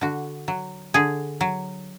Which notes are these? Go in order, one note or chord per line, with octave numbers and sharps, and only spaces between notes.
D3 F#4
F#3
D3 G#4
F#3